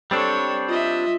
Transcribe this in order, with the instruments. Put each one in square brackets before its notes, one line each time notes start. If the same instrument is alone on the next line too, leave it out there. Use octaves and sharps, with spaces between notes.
[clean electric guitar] G3 C4 D4 [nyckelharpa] A4 C#5
[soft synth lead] F4 [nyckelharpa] D#5 E5